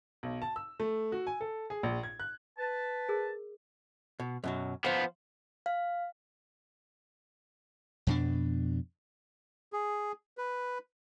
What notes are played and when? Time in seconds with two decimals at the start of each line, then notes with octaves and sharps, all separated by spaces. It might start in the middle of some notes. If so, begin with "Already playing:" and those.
0.23 B1
0.42 A5
0.56 E6
0.80 A3
1.12 F#4
1.27 G#5
1.41 A4
1.70 G#4
1.83 A#1
2.03 G#6
2.20 F#6
2.59 B4 A5
3.09 G#4 A#4
4.20 B2
4.44 F#2 B2 F#3
4.85 F3 B3 C5 F5
5.66 F5
8.07 F2 B2 D4
9.73 G#4
10.38 B4